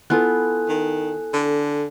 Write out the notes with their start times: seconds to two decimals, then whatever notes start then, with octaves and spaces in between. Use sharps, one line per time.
0.10 B3 E4 F4 A4 G#5 F#6
0.68 D#3
1.33 D3